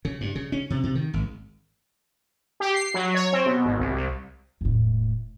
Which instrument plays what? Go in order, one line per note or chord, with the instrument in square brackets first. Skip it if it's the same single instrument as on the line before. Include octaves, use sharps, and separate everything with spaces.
[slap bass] C#3
G2
C#3
C#4
C3
C3
D#3
G#1
[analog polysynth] G4
C7
F#3
C#5
C4
B2
G#1
C2
C2
[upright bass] E1 A2